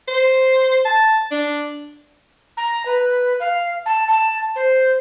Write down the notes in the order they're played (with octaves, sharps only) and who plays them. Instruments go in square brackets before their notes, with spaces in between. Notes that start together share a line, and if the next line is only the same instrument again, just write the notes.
[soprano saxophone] C5
A5
D4
[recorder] A#5
B4
F5
A5
A5
C5